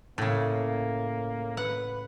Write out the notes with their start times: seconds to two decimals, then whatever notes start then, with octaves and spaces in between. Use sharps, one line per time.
0.18 A2 C#3 A#3
1.57 B4 F#5